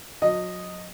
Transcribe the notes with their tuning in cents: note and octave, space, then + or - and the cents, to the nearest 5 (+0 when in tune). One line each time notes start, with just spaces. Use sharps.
F#3 -35 D#5 +0